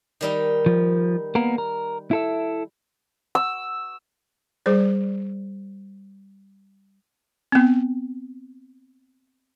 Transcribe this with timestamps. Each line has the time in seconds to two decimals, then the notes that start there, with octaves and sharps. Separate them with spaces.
0.21 D#3 G3 D#4
0.66 F3
1.35 A#3 B3 A#4
1.58 A#4
2.11 E4 A4 E5
3.35 E6
4.66 G3 G#4 C5 D5
7.52 B3 C4